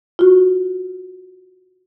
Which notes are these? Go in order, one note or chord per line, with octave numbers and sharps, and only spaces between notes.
F4 F#4